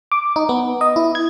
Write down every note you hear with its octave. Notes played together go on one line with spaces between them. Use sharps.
D6
D#4
B3
D#5
E4
G#6